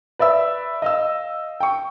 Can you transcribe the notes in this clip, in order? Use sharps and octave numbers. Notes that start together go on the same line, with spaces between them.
B4 D5 E5 E6
D#5 F5 E6
G5 C#6